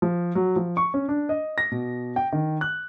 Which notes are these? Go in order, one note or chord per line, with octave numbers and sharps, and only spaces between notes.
F3
F#3
F3
C#6
C#4
D4
D#5
A#6
B2
G5
D#3
F#6